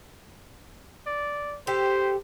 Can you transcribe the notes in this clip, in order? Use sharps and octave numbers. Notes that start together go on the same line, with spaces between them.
D5
G4 A4 C5